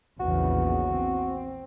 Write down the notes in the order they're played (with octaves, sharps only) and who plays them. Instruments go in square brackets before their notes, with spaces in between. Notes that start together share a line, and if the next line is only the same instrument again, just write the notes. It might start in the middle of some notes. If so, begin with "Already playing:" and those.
[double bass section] A#1 E2 C#3 [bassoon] F#4
[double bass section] C4